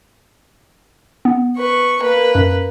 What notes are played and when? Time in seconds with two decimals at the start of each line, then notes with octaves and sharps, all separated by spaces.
1.25 B3
1.58 B4 C#6
2.03 A#3 B4
2.35 F#2